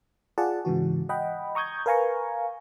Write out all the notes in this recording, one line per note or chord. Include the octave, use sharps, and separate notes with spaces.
F4 G#4 D5 F#5 A5
G#2 C#3 E3 F#4
D#5 F#5 G5 B5
A#5 C#6 D#6 G6 G#6
A#4 B4 F5 G#5 A#5 C#6